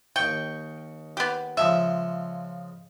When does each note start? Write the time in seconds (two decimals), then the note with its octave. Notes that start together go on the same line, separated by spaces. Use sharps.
0.16 D#2 G5 C#6
1.17 B3 G4
1.57 C#3 F3 G#3 E5